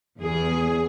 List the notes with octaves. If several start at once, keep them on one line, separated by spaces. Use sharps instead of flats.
E2 G#4